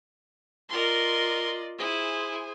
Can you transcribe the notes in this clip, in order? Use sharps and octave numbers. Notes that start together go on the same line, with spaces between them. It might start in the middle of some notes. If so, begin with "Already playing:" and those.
F4 A#4 D5 D#5 C6
E4 G#4 C5 G#5